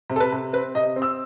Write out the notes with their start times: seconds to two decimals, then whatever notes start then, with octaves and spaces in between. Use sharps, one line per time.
0.10 C3
0.16 A4
0.20 B4
0.32 C3
0.53 C4 B4
0.75 C3 D#5
0.96 C4
1.02 E6